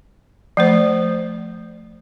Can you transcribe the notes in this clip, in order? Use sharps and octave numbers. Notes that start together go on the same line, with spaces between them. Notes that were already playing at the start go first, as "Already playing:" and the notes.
F3 A3 C5